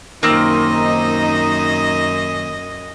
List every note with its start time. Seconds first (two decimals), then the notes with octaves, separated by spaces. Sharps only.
0.23 F#2 A#2 D#3 A#3 C4 D#4 D#5